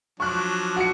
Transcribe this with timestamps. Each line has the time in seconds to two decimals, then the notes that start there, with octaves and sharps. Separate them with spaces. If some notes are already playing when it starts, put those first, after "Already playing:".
0.20 F3 F#3 D4 C#6 F#6
0.76 F#4 C#7